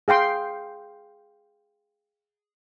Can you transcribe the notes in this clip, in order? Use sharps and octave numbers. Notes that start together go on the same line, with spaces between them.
G#4 F5 G5 C6